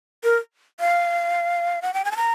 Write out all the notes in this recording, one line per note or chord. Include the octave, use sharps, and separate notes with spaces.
A#4
F5
F#5
G5
G#5
A5
A#5